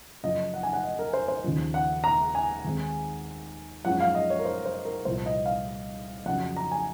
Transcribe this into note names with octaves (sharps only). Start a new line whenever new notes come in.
F#2 C#3 F3 D#5
F#5
G#5
F#5
D#5
A#4
C5
C5
D#2 C#3 F3
F#5
A#5
G#5
D#2 D#3 G#3 C4
F#2 F3 G#3 C#4 F#5
F5
D#5
C#5
A#4
C5
C5
A#4
C2 A#2 F3 C5
D#5
F5
F2 C#3 F#3 F#5
A#5
G#5